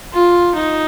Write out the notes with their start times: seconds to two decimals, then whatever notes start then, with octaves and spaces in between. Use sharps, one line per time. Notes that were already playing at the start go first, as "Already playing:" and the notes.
0.13 F4
0.54 D#4